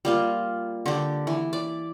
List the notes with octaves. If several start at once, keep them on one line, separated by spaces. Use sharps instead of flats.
G3 A#3 F4
D3 G4
E3
D5